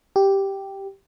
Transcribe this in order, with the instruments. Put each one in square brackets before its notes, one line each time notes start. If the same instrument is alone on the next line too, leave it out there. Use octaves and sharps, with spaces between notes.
[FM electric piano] G4